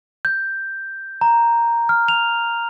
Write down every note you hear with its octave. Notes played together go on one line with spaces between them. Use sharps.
G6
A#5
F6
F7